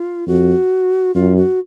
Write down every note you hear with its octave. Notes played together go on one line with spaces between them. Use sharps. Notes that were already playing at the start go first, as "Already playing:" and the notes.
Already playing: F4
F2 F#4
F#2 F4
F#4